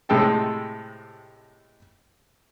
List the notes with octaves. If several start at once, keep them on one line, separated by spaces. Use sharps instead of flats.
A2 C3 G#3 A4 G5 A5